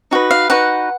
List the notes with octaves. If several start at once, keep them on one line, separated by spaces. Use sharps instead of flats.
D#4 F#4 B4
F5
D#4 F#4 B4 F#5